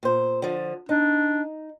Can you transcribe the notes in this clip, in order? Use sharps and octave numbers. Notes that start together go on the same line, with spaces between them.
A#2 C5
D3 F3
D4 D#4